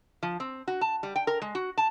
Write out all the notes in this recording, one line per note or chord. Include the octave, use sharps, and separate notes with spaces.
F3
C4
F#4
A5
G3
G5
A#4
G#3
F#4
A5